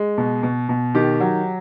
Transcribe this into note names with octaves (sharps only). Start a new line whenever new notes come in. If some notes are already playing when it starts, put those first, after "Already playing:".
Already playing: G#3
B2
B2
B2
D#3 G4
F#3